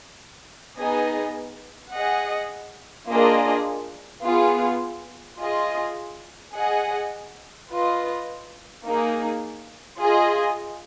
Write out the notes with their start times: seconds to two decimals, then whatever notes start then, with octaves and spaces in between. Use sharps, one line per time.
0.79 B3 D#4 G#4 D#5 G#5
1.94 G#4 D#5 F#5
3.09 A#3 D4 F4 G#4 D#5
4.24 B3 F4 G#4
5.39 F4 G#4 D#5
6.54 G#4 D#5 F#5
7.69 F4 B4 D#5
8.84 A#3 D#4 G#4
10.00 F4 G#4 D#5 G#5